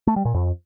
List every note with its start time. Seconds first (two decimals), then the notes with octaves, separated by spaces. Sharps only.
0.07 A3
0.16 G3
0.25 A#2
0.34 F2